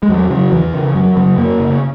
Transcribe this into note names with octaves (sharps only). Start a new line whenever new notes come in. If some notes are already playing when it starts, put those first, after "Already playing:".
G#3
E2 F#3
C#3 F#3
E2 E3
C#3
F#2 F#3
C#3 F#3
F#2 A#3
C#3